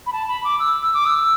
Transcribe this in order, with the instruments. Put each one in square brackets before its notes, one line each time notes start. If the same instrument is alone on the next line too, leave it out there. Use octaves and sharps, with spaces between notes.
[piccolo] B5
A5
B5
D6
E6
E6
D6
E6